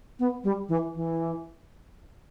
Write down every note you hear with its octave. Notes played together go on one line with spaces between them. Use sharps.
B3
G3
E3
E3